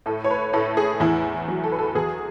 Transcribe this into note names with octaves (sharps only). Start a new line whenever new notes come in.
A2 A4
C#5
B4
A2 A4
G#4
E2 E4
F#3
A4
B4
A4
E2 G#4